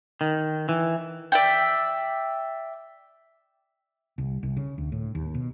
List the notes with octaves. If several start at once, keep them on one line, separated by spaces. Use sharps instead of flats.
D#3
E3
D5 E5 G5
C2
C2
C#3
D2
A2
D#2
B2